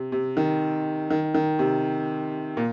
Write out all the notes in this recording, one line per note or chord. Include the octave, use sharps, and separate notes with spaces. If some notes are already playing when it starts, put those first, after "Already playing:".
Already playing: C3
C3
D#3
D#3
D#3
C3
A#2